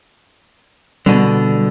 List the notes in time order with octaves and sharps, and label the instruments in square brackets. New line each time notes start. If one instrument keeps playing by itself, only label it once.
[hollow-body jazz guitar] B2 D3 [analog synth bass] G3